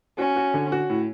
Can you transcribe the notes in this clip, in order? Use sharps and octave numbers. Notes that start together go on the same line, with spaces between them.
C#4 F#4
F#4
D3
F#4
A2